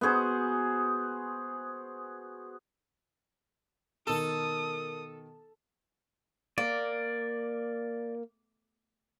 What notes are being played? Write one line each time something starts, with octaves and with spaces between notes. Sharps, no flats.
B3 F#4 G#4 C5
B2 D#3 A4 A#4 D#6
A#3 D5